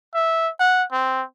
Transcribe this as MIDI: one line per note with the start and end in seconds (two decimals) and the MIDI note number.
0.15 0.50 76
0.60 0.83 78
0.92 1.23 60